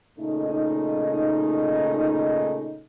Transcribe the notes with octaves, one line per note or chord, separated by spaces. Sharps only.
A#2 C#3 A3 D#4